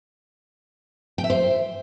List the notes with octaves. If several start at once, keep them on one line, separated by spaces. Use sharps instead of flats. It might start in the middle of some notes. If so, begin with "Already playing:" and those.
G5
E5
C5